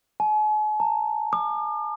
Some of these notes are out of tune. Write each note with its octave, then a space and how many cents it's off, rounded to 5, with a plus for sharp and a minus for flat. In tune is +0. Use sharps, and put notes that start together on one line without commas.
G#5 +45
A#5 -45
D6 +45